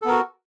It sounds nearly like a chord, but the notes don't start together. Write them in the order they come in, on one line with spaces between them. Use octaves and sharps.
A4 B3 A#4 F#4